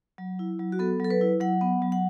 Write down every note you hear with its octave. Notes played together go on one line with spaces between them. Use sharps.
F#3
E4
F#3
F#4
B3 A4
F#3 A4
B4
E4
F#3 F#5
B3
F#3
F#5